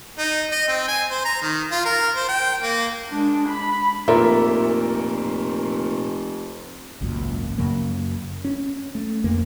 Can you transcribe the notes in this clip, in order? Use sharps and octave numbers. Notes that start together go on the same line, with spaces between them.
D#4
D#5
C4
G#5
C5
A#5
D#3
F4
A#4
C5
G5
A#3
G#3 D4
B5
F1 A#2 A#4 E5
G#1 C#2 F#2 A#2
F#2 C#3 F#3 A#3
C#4
A3
F2 D3 A#3